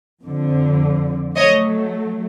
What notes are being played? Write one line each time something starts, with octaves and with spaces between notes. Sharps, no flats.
F2 D3 F3
F#3 A3 C#5 D#5